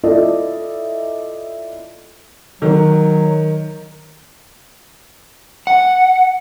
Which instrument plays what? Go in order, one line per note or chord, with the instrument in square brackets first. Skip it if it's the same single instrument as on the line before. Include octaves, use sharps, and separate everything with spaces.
[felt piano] E4 F4 A4 D5 D#5
[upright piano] D#3 [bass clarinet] F#3
[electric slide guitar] F#5